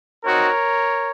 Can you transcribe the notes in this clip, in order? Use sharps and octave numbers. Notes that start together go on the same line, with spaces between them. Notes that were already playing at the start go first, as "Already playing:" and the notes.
C4 D#4 F#4 A#4 C#5